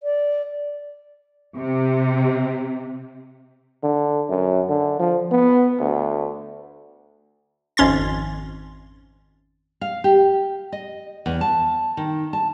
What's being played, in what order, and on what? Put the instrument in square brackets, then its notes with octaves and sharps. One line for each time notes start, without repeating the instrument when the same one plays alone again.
[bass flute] D5
[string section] C3
[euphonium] D3
F#2
D3
F3
B3
D2
[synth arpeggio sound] G#1 F2 C#4 C6 A6
[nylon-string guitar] F5
G4
D#5
E2
A5
D#3
A5